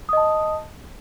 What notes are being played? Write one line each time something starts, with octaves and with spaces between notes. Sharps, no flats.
D#5 A5 D#6